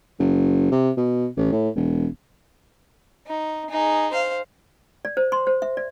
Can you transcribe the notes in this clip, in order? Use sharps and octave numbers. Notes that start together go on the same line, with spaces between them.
F#1
C3
B2
A1
A2
E1
D#4
D#4 G#4
C5 F5
D5
C5
C6
C5
E5
D5